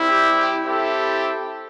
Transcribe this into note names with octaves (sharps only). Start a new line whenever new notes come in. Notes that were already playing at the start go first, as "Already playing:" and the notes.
Already playing: G3 C4 E4
G4
G4
C4 E4 G4 A4